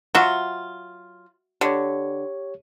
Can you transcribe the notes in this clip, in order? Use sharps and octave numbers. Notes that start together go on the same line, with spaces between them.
F#3 F4 F#4 E5
D3 G4 C#5